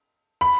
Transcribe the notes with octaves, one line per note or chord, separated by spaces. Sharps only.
B5